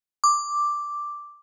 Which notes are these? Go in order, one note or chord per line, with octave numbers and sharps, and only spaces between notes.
D6